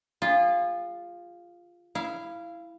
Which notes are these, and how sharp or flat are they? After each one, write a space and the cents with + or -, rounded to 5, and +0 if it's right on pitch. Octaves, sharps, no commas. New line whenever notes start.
F4 +0 G#4 -35
E4 +5 F5 -20